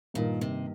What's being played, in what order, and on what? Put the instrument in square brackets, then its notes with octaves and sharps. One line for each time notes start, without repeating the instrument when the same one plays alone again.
[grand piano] G2 D#3 A#3 D#4 A#4 [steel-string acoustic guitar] A#2
[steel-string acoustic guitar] C3